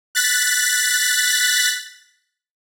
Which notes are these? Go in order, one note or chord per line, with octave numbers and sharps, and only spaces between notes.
F#6 A6 B6